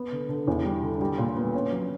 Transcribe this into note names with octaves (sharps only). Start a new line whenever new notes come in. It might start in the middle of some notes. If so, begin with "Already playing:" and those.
Already playing: B3
D3
D3
E2
G3
D3
G3
A#2
B3
C#4
F#3